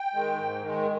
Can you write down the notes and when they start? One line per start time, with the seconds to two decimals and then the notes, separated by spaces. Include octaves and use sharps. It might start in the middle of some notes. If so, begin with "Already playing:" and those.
Already playing: G5
0.14 D#3 G#3
0.38 G#2
0.62 D#3 G#3